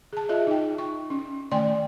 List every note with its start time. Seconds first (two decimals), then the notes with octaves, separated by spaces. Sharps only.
0.13 G#4 A5
0.29 F4 G#4 D#5 E5
0.47 D#4 G5
0.78 C#6
1.10 C#4
1.52 D#3 A3 D5 G5 G#5 C6